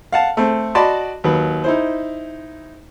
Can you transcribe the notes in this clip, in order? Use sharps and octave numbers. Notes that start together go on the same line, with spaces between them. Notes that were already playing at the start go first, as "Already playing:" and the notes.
F5 F#5 A5
A3 C4
F#4 D5 D#5 A5 B5 C6
D#2 F#3 B4
D#4 E4 C5